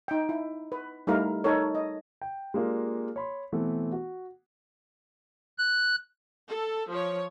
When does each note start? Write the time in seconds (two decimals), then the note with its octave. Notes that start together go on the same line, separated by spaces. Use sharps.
0.08 D#4 G5
0.29 E4
0.72 B4
1.07 G3 A3 D#4 E4 A#4 F5
1.44 D#4 A4 A#4 C#5
1.75 D#5
2.22 G5
2.54 G#3 A#3 D4 F4 G4
3.16 C#5 B5 C6
3.52 B2 E3 A3 B3 C4
3.92 F#4
5.58 F#6
6.49 A4
6.90 F3 C#5